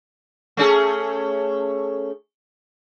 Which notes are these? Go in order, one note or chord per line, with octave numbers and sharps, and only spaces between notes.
A3 C#4 G#4